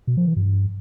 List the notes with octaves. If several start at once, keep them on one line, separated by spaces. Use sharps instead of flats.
B2
F3
E3
G2